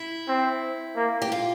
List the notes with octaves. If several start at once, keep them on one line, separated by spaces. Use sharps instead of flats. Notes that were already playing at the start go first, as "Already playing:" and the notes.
Already playing: E4
C4
A#3
G4
F4